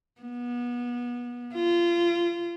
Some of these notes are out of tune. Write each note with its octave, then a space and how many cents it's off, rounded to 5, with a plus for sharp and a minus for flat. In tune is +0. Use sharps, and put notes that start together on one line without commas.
B3 -30
F4 -25